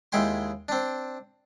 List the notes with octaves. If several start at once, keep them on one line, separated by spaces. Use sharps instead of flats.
D#2 G#3 E4 G5 C6
C4 D4